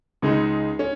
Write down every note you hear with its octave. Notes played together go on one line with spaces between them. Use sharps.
C#2 C#3 G#3 D#4
C#4